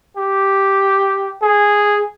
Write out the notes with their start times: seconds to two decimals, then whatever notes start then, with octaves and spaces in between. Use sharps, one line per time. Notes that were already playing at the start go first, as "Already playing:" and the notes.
0.17 G4
1.42 G#4